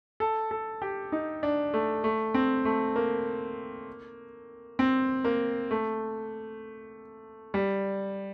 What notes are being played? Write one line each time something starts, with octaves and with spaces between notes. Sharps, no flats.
A4
A4
G4
D#4
D4
A3
A3
C4
A3
A#3
C4
A#3
A3
G3